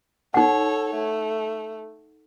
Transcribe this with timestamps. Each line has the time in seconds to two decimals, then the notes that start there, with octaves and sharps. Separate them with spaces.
0.34 D#4 A4 C#5 F#5
0.95 A3